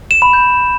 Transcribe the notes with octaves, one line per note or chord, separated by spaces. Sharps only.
E7
B5
G6